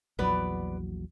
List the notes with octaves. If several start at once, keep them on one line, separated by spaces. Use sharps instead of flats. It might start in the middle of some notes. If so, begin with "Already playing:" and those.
A#1 E2 F#3 B3 B4 D5